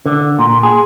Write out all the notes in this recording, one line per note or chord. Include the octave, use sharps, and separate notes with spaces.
D3
A#2
G#4